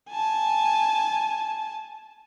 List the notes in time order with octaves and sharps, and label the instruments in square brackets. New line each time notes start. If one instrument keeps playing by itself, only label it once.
[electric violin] G#5 A5